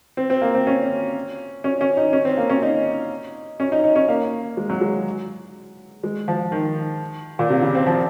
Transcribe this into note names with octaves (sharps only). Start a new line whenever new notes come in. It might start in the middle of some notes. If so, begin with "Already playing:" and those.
C4
C4
A#3
C4
C#4
C#4
C#4
D#4
C#4
C4
A#3
C#4
D#4
C#4
D#4
D#4
C#4
A#3
G#3
F#3
G#3
G#3
F3
D#3
A#2
C3
C#3
C4
F3